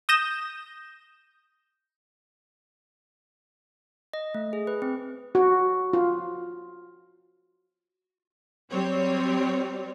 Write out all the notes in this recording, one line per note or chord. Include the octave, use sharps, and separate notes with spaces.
D#6 G6 A#6 E7
D#5
A3
G#4
B4
C4
F#4
F4
F#3 G3 C4 C#5